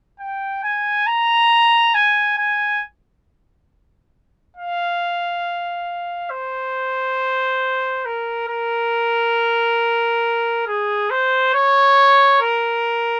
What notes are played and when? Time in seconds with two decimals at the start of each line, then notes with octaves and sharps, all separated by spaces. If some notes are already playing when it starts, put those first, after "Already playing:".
0.20 G5
0.64 G#5
1.07 A#5
1.94 G#5
2.38 G#5
4.57 F5
6.30 C5
8.05 A#4
8.48 A#4
10.67 G#4
11.10 C5
11.54 C#5
12.41 A#4